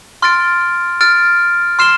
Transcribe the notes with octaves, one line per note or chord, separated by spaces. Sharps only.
C6 F6 A6 D7
F6 A6 D7
C6 F6 C7 E7 G7